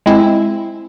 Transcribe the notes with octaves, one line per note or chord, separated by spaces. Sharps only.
G#3 C4 E4